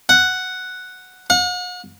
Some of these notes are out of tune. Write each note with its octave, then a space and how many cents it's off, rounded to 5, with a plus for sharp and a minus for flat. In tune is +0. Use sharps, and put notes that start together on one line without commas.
F#5 +0
F#5 -45